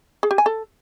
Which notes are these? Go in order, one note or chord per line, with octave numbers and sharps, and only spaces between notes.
G#4
G4
G#5
A4